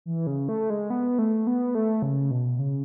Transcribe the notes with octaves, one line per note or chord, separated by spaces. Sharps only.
E3
C#3
A3
G#3
B3
A3
B3
A3
C#3
B2
C#3